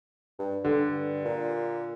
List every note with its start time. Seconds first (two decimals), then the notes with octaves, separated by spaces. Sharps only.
0.39 G2
0.65 G2 D3
1.25 A#2